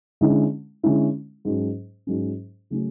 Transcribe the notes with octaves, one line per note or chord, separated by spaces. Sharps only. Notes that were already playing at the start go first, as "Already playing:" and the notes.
D3 G#3 C#4 E4
D3 G#3 C#4 E4
G#2 F#3 C#4
G#2 F#3 C#4
C#3 F#3 A3 C#4